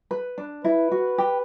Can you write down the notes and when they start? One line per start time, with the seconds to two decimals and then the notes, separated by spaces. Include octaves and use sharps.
0.11 B4
0.38 D4
0.64 E4 B4
0.92 F#4
1.18 G4